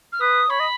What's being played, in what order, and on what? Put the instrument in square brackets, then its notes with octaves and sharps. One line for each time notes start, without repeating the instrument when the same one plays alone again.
[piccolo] F6
[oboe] B4 [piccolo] D#6
[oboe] C#5 [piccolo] B5
[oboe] D#5